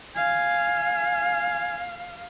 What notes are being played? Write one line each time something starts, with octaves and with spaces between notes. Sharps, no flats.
F5 G#5